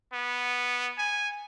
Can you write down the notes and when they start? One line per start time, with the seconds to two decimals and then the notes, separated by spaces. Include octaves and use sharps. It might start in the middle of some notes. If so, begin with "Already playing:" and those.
0.13 B3
0.98 G#5